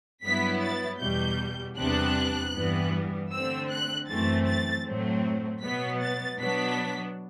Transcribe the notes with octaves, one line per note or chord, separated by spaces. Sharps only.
G2 F#3 B3 E4 B6
A6
E2 B2 G3 G6
E2 C3 G3 B3 D4 F#6
G2 E3 G3 B3
D3 A3 C4 E6
F#6
F#2 E3 A3 C4 A6
A6
A2 F#3 A3 C4
B2 F#3 B3 B6
A6
B2 F#3 B3 D4 B6